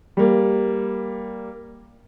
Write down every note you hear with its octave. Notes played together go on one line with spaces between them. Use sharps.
G3 A#3